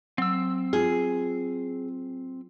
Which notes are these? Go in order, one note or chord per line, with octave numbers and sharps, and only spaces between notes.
F#3 C4 E6
F4 G#4